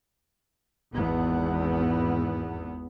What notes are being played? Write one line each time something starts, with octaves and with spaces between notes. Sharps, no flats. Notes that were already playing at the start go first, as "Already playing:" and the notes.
G#1 E2 B3